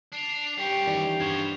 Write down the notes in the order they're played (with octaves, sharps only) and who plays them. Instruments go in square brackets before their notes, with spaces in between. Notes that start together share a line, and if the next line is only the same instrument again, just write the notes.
[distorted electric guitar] D4 [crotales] C7 E7 F7
[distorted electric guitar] G3 C#4 [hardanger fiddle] G4
[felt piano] D#3 E3 D5
[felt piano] G2 C#6 [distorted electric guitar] F3 B3 [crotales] G#6 E7 G7